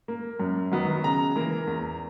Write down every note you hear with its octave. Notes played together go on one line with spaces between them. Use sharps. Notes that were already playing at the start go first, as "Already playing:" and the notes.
A#3
F#2
D#3 F#3 B3
C#3 A#5
E3 A#3
E2